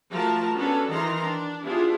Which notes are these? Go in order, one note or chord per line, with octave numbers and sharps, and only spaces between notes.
F3 A3 F#4 A#4 A5
B3 C#4 D4 F#4 A4 B4
D#3 E3 A#5 C6
D4
B3 D4 E4 F4 G4 G#4